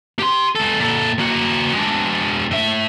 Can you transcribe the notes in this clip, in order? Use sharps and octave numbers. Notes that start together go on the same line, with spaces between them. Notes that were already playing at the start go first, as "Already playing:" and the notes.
G4 C6
G#3 A4
A#2 A4
A#3 F#4
G#3 D4
A2 E5